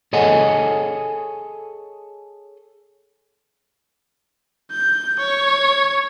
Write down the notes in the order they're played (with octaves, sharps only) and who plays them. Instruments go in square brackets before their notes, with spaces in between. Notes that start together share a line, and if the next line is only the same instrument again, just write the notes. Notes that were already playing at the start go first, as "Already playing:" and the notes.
[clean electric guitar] G#4 A4 C#5 D#5 F#5 G#5
[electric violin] G6
C#5